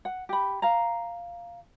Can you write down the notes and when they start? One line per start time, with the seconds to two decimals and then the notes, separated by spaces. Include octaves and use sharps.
0.05 F#5
0.29 G4 B5
0.62 F5 A#5